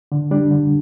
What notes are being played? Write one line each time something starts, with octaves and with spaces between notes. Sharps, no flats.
D3
G3 D4
D3